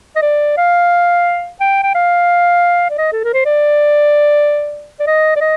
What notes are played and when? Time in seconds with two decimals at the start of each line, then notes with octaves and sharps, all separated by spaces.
0.16 D#5
0.22 D5
0.58 F5
1.60 G5
1.83 G5
1.95 F5
2.90 D5
2.98 D#5
3.13 A4
3.24 A#4
3.34 C5
3.45 D5
5.00 D5
5.07 D#5
5.36 D5
5.41 D#5